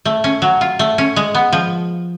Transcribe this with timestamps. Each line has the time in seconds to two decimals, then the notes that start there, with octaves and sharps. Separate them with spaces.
0.05 A3
0.24 C#4
0.42 F#3
0.61 F4
0.79 A3
0.98 C#4
1.16 G#3
1.35 B3
1.53 F3